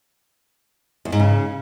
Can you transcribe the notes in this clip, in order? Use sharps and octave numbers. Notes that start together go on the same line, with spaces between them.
E2
G#2
C#3